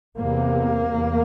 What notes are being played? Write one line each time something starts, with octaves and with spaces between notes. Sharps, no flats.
E2 C3 A#3
E2